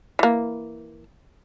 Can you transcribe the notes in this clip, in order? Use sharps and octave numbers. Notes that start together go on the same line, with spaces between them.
E3 A#3